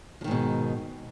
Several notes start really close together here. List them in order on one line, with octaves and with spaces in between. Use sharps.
F3 D#3 G#2 B2